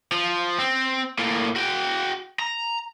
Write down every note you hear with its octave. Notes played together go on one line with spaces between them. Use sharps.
F3
C4
A2 A#3
F#4 G5
A#5